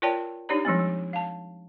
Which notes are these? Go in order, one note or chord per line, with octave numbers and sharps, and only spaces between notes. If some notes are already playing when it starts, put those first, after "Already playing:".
F4 A#4 C#5 D5 G5 A5
D4 D#4 G4 C#5 D5 A#5
F3 G3 G#3 C4
G3
F5 A5